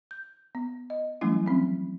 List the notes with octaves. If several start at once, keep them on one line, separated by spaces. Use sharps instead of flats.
G6
B3
D#5
E3 F#3 G3 A3 C#4 E4
F3 F#3 C4 C#4